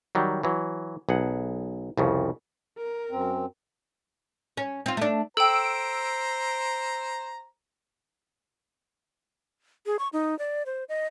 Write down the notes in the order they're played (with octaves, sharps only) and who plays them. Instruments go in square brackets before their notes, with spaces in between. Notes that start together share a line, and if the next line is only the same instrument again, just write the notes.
[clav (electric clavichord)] D#3 F#3 G3
E3 F#3
B1 G#4 F#5
C2 F2 C#3
[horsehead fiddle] A#4
[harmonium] F#2 C4
[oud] C#4
C4 F4
A3 D4
[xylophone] A4 G5 [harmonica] C5 A#5 [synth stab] E6 D7
[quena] G#4
C#6
D#4
D5
C5
D#5